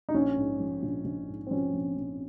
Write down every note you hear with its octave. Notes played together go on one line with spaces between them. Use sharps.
D#4
A#1 C#4
G#2
F3
A#1
A#1
G#2
C4
F3 C#4
A#1
A#1